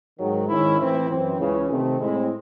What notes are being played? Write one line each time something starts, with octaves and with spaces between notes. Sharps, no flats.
G#2 D#3 F#3
G#2 D#3 G#3 C#4 E4
A2 E3 C4 E4
F#2 E3 C4 E4
C#2 C#3 E3
C3 D#3 A3 C4
A2 G#3 C4 E4